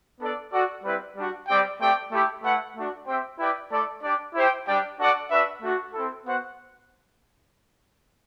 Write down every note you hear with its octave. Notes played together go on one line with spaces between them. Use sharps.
B3 D4 A4 D5
F#4 A4 D5 F#5
G3 C4 E4 B4
G3 D4 F#4
G3 C4 G4 D5 G5
A3 C4 G4 D5 G5
A3 E4 G4
A3 E4 B4 F#5
A3 D4 F#4
C4 G4 C5 E5 G5
E4 G4 B4 D5 G5
A3 E4 A4 D5
D4 G4 D5
E4 G4 C5 G5
G3 D4 G4 D5 G5
D4 F#4 A4 D5 F#5
D4 F#4 B4 E5
A3 D4 F#4
C4 E4 A4
B3 F#4 C5 F#5